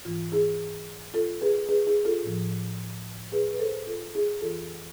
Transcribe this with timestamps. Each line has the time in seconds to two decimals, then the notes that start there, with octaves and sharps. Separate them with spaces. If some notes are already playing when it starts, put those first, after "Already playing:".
0.05 G#2 E3 F4
0.32 E4 G#4
1.14 F4 A4
1.41 G#4 B4
1.69 G#4 B4
1.87 E4 G#4
2.05 F4 A4
2.23 A2 F3
3.32 G#4 B4
3.53 B4
3.59 A4 C5
3.87 F4 A4
4.15 E4 G#4
4.41 F2 E3 F4 A4